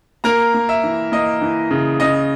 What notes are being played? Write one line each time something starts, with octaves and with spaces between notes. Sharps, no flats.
A#3 A#4 A#5
A#3
E5
E3
A#3 D#5
E3
C#3
C#3 D#5